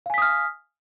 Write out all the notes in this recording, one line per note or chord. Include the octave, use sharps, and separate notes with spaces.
F5 G#5 D#6 F6 B6